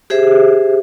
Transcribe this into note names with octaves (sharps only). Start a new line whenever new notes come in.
G4 G#4 C5 E5